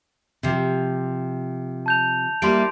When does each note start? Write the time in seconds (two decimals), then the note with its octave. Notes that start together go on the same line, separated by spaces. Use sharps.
0.43 C3 F3
1.86 A5 G6 F7
2.42 G3 A#3 E4 C6 D7